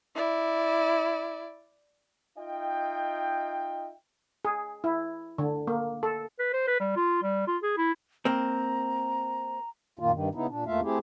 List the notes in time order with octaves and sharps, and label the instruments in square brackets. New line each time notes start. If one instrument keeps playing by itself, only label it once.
[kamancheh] E4 D5
[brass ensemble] D#4 F4 D#5 E5 G5
[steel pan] G#4
E4
D3
A#3
A4
[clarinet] B4
C5
B4
G3
F4
G3
F4
G#4
E4
[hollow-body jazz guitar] A#3 C4 [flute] A#5
[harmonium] F#2 A#2 D#3 A#3 F4
G2 D#3
C#3 B3 D#4 E4
A#2 D4
E2 A3 A#3 F4 E5 F5
A3 C4 E4 G4 G#4